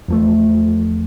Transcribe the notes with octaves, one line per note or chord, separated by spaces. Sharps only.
E2 F3 A3